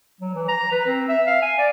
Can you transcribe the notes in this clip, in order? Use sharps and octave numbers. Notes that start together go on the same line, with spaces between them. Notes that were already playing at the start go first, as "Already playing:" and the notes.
F#3
E3
A#5
B4
C4
E5
F5
G#5
D5